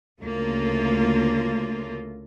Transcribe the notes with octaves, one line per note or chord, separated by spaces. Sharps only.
D2 C#3 A3 A#3 F4